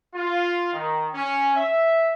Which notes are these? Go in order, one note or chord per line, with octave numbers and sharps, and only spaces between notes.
F4
D#3
C#4
E5